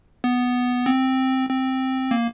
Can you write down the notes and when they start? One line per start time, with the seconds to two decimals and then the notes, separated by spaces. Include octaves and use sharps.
0.24 B3
0.86 C4
1.49 C4
2.11 A#3